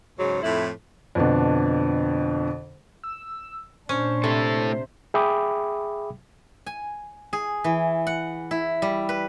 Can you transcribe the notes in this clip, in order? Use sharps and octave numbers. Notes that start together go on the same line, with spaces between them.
G#2 C#3 F#3
F2 A2 E4
F2 B2 D3 D4
E6
A#2 C#4 D4 C5
A2 C3 A4
G#4 E5 G5 B5 D6 D#6
G#5
G#4
E3
F#5
E4
G3
B4